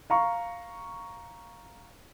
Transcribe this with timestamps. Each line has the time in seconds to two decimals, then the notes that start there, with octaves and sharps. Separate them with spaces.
0.10 F5 A#5 C#6